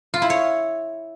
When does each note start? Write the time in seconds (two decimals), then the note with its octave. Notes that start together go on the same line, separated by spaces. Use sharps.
0.14 F4
0.22 E4
0.30 C#5